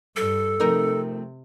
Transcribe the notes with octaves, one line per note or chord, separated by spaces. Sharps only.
G2 A4
C3 F3 A3 C4 D#4 A#4